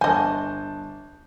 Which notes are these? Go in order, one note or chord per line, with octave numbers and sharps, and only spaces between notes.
G1 D#5 G#5 A5 G6